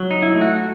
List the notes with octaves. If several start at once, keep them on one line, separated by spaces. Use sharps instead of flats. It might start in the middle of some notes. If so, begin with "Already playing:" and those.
Already playing: F#3
D#4
E4
A3
F#4